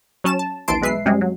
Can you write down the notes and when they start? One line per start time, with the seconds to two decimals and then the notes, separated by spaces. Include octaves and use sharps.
0.24 F#3 C#4 A5 E7
0.39 A5
0.68 A#1 D#2 E3 A5 C6 D7
0.81 B1 G#3 B4 E5 C7
1.05 F#2 C3 G3 G#3
1.21 F#3